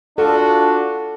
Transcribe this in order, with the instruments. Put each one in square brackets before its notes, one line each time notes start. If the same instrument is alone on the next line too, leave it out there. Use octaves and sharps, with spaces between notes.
[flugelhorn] D4 [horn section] F4 F#4 [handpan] A4